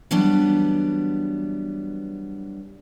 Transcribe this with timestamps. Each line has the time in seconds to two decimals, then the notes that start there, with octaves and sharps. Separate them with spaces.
0.11 E3 F#3 G3 B3 D4